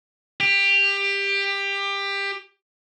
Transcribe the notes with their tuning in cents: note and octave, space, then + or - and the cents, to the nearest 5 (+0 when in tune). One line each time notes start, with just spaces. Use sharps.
G4 +20